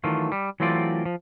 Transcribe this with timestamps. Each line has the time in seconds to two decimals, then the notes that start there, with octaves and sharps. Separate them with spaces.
0.04 D#3 E3 F#3 A3 F4
0.32 G3
0.60 E3 F#3 A3 C4 F4 D5
1.05 F3